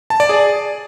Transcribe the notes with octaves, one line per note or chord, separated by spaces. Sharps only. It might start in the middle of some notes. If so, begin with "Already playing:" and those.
A5
D5
G#4